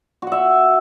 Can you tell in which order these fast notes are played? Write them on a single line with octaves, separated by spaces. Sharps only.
F#4 F#5 E5